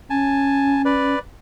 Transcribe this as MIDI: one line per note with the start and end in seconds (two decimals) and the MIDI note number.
0.10 1.15 61
0.10 0.82 80
0.10 0.82 81
0.85 1.19 71
0.85 1.19 74